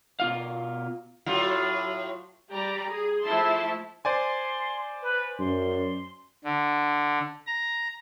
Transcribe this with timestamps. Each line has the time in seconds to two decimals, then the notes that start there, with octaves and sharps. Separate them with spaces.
0.20 B2 F4 F5
1.26 A2 F#3 F4
2.52 G3 G4 D5 A#5
2.89 G#4
3.23 F3 A3 E4 E5 A5 C6
4.05 C5 D5 G#5 C6
5.02 B4
5.39 F#2 C6
6.44 D3
7.47 A#5